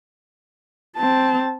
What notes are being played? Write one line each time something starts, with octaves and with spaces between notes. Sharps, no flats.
C4 A5